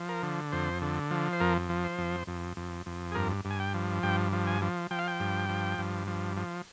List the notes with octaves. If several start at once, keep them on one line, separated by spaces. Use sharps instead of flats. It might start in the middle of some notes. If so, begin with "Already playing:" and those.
Already playing: F3
A#4
D3
F2 C5
D3
F3
C5
F2 A#4
F3
C5
F2
F2
F2
F2
G#4
G2 A#4
G2
G#5
G5
F3
G2 G5
F3
G#5
F3
F3 G5
F5
G5
G2
F3
G2
F3
F3